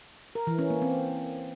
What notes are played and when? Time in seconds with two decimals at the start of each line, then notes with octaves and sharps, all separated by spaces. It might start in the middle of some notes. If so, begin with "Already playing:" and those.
0.35 A#4
0.47 E3
0.59 C#4
0.70 A#3
0.82 C4